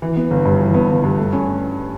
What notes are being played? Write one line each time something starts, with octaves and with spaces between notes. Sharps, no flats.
E3
B3
G1
G2
E3
B3
G1
G2
A3
C#4